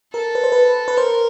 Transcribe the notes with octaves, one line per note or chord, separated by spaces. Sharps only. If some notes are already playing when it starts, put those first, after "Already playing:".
A4 A#4
B4
C5
B4
B4
A#4 C5